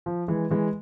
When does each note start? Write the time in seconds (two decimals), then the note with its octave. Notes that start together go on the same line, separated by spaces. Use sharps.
0.06 F3
0.28 E3 G#3
0.51 E3 G#3